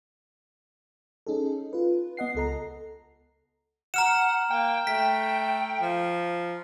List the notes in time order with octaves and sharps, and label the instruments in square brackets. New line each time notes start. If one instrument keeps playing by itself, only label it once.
[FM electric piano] C#4 D#4 G#4 A4
F4 B4
B3 D#5 F#5 C7
C#2 A4 A#5
[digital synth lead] F#5 [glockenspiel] A#5 F6 E7
[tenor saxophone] A#3 [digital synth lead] G5
[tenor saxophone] A3 [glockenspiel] B6
[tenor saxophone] F3